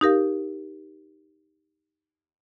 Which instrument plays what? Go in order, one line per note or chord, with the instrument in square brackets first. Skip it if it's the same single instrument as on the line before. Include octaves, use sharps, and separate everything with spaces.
[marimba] D#4 G4 A#4 F5